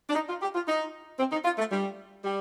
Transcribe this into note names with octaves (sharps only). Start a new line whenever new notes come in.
D4
D#4
F4
G4
F4
D#4
C4
D#4
F4
A3
G3
G3